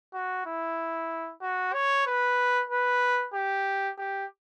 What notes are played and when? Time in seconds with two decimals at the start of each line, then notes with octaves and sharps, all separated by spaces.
0.13 F#4
0.46 E4
1.41 F#4
1.73 C#5
2.06 B4
2.70 B4
3.34 G4
3.98 G4